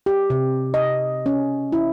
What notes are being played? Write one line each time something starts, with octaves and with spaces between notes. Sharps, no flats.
G4
C3
D#5
C#4
E4